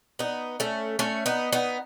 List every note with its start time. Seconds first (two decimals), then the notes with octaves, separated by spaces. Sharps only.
0.19 B3 D#4
0.60 A3 C#4
0.99 A3 C#4
1.26 B3 D#4
1.53 B3 D#4